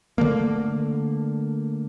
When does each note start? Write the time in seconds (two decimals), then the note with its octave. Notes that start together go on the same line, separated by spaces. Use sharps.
0.18 D3 A3 A#3